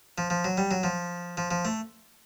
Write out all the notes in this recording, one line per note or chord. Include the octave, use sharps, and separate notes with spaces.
F3
F3
F#3
G3
F#3
F3
F3
F3
A3